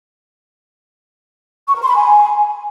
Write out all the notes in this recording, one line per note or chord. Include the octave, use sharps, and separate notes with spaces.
C#6
A#4
C6
B5
G#5